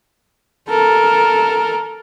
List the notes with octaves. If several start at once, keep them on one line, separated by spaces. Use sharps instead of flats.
A4 A#4